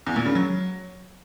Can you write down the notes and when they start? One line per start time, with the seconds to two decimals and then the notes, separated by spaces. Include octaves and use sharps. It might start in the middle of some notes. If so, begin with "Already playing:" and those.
0.07 E2
0.16 A#2
0.26 C#3
0.35 F#3